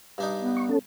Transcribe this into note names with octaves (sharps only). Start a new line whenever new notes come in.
G2 D4 D#4
B3
C#6
C#4 A4